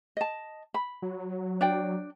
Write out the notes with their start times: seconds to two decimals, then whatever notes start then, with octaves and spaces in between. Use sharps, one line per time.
0.17 D#5 A5
0.74 B5
1.02 F#3
1.61 D4 D5 G5